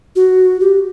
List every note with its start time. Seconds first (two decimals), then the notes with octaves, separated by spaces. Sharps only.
0.16 F#4
0.60 G4